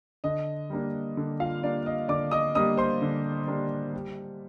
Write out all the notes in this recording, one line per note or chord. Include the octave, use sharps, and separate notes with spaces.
D3 D#5
G3 A#3 D4
D3
F4 F5
G3 A#3 D4 D5
D#5
D3 D5 D6
D#5 D#6
G3 A#3 D4 D#5 D#6
C5 C6
D3
G3 A#3 D4
G3